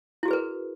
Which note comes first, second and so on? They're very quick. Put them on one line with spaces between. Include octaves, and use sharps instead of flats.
E4 F#4 G#4 B4 A#4